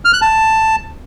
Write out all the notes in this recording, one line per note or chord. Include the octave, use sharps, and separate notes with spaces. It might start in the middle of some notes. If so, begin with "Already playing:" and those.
F6
F#6
A5